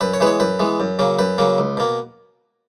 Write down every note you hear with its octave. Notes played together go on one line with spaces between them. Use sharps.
F#2 B4
C#5
E3 G#3 B3 B4
C#5
F#2 B4
E3 G#3 B3
F#2
C#3 F#3 A#3
F#2 B4
C#3 F#3 A#3
C#2
B2 A#3